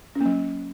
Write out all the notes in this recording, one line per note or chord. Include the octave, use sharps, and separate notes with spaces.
C#4
A#3
F#3